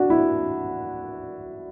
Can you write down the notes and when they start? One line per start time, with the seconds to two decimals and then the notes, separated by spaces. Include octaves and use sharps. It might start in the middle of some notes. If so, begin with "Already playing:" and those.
Already playing: D4 F#4
0.10 E4